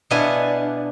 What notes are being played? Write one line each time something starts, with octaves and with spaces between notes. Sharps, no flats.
B2 B3 D4 E4 F5 G#5